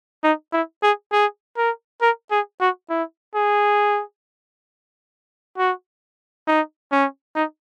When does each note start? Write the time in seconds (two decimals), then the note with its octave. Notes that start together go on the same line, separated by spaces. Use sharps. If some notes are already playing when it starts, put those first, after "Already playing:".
0.23 D#4
0.53 E4
0.83 G#4
1.12 G#4
1.57 A#4
2.02 A#4
2.31 G#4
2.60 F#4
2.90 E4
3.35 G#4
5.58 F#4
6.47 D#4
6.92 C#4
7.35 D#4